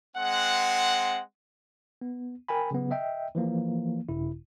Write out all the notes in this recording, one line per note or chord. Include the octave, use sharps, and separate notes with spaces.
G#3 C4 F#5
B3
A#4 G5 G#5 B5
C#3 F#3 B3
D#5 E5 G5
E3 F3 A#3
A#1 G2 C#3 E4